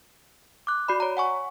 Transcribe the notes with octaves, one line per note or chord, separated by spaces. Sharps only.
D6 F#6
F#4 D5 B5
C#5 A#5
F#5 G#5 C#6